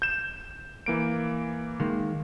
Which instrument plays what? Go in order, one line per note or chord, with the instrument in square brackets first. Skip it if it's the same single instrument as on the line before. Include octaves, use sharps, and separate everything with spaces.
[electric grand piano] G6 E7
E3 A#3 D7
[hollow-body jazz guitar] D#3 G#3 A#3